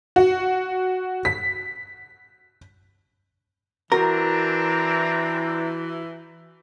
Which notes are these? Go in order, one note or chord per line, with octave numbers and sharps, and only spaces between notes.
F#4
B6
E3 C4 D4 F#4 A#4 A#5